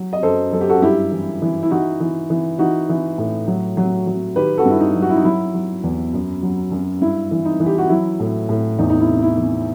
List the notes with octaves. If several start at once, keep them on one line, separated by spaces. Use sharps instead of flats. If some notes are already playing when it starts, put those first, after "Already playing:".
Already playing: F#3
D#5
F#2 A4 C5
F#2 A4
G4
F#4 A4
G2 E4 G4
E3
E3
E4
E3 D#4 F#4
E3
E3
E3 D#4 F#4
E3
A2
F#3
F#3
F#3
D#3 G4 B4
F#4 A4
G2
E4
D#4
F#3
F#4
E4
D#4
F#3 E4
F#3
E2
F#2
F#3
F#2
G2 E4
E3
D#4
E3
G4
F#4
F#3 E4
A2
A2
E2 D#4
D#4
E4
C3
E4
E3